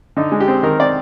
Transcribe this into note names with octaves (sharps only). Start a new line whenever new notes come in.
D3 D#4
G#3
G4
C4
D#3 A#4
C4 D5